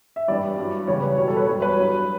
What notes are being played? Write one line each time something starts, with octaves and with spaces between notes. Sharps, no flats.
E5
G2 E3 G3 D5
G2 F#3
E2 C#3 G3 C#5
B4
B2 G3 C#5
A4
B4
F#2 E3 G3 C#5
B4
G2 F#3